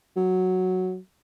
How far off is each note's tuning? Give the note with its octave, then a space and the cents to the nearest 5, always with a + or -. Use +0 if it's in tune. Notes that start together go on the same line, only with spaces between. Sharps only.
F#3 +0